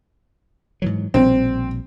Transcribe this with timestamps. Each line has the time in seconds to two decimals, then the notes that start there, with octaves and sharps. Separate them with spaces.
0.82 G#2 E3 F#3
1.14 A#1 B2 G3 C4